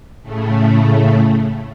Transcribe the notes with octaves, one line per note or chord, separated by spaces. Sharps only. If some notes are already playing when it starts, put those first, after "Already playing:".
A2 C#3 A3